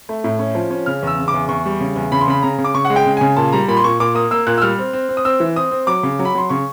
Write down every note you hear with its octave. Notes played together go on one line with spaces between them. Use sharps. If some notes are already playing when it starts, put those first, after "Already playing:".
A3
A2
C#4
F3
C#4
C#3 F6
E2 E6
C#3
D6
E2
E2 C#6
G3
C#3
E2
C#3 B5
C6
C#3 B5
C#3 A#5
C#3
D6
C#3 C#6
F#5
G#3
G5
C#3
C#3 G#5
A#2 A5
G3 A#5
A#2 B5
C6
A#2 C#6
A#2 D6
A#3 D#6
A#3 E6
A#2 F#6
E6
G3 F6
C4
C4
C4
D#6
C4 E6
E3
C4 D#6
C4
F#3 D6
C#3
F#3
B5
F#3 C6
C#3 C#6